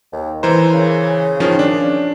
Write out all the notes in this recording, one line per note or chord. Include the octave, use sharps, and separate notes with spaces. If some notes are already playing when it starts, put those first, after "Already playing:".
D#2
E3 A#4 C5
C#3
D#3 F3 C#4
D4